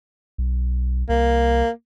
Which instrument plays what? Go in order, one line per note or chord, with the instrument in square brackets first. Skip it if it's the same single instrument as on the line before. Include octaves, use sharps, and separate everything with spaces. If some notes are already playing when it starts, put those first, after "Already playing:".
[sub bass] B1
[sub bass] C2 [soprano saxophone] A#3